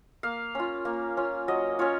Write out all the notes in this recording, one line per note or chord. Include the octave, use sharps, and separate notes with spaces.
A#3 F5
C#4 F4
A#3
C#4 F4
F#3 D#5
C#4 F4 C#5